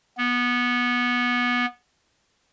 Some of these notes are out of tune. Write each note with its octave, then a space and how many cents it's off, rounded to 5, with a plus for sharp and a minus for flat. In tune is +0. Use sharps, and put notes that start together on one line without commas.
B3 -15